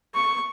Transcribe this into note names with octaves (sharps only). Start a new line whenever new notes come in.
C#6